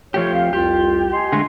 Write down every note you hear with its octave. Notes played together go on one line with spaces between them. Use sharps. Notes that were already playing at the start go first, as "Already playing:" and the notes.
F3 A3 G4 C#5
D2 C4 F5
C2 F2 F4 G4
D#5 G#5 C6
D3 G#3 A3